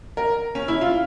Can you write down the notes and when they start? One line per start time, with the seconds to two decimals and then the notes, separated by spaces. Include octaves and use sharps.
0.17 A#4
0.55 C#4
0.68 E4
0.81 F4